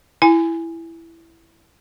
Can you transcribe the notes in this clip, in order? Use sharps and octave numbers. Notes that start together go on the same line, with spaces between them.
E4 G#5